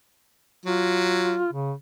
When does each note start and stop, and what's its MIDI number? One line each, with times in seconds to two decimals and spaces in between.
0.65 1.40 54
0.65 1.52 65
1.53 1.73 49